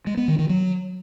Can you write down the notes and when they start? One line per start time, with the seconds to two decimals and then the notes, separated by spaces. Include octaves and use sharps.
0.07 G#3
0.17 B3
0.28 D#3
0.39 D#3
0.49 F#3